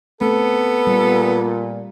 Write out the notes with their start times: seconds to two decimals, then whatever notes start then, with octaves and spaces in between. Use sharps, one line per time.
0.21 A3 B3 C4 A4
0.87 A#2 G3